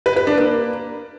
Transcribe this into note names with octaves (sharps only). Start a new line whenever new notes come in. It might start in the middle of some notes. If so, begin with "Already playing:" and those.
B4
B4
D4
A#3